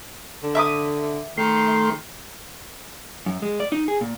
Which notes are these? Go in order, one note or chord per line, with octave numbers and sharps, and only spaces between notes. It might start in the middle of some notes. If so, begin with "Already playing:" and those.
D3
E5 D6 D#6
D#3 A3 C6
F#2
G#3
D5
D#4
G#4
A#2